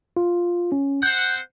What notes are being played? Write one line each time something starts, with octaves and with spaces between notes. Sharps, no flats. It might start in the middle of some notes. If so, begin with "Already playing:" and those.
F4
C#4
C4 C5 F#5 G6